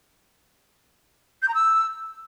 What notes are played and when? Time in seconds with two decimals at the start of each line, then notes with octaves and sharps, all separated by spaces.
1.42 G6
1.48 A#5
1.54 E6